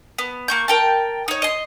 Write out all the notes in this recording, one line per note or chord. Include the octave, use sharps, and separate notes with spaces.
B3
A#3 C#6 G6
A#4 G5 A5
D#4 C#5
D#5 C6